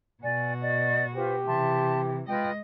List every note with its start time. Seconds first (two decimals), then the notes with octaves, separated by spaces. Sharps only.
0.23 B2 F#4 D5 G#5
0.62 D5 D#5
1.15 F4 G4 B4 C5
1.47 C3 E3 E5 A5 C6
2.29 G#3 F4 B4 D#5 G5